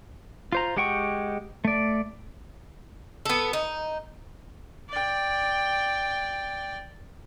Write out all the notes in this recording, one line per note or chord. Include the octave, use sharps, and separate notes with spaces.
F4 C5 A#5
G#3 G4 F#5 G5 C#6
A3 D5
B3 A4
D#4
D5 G5